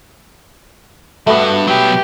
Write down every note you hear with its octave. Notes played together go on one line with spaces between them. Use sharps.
G2 A3 B3 F#4
B2 F#3 G4